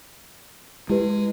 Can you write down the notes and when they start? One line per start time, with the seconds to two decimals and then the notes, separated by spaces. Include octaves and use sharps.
0.90 G#3 E4 G4 B4